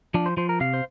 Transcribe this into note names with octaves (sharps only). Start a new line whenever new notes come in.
F3 D4
C5
F3 C5
A#4
C3 F5
C5